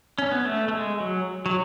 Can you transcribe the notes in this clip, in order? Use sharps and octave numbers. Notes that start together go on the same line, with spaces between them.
C#4
B3
A3
A3
G#3
F#3
F#3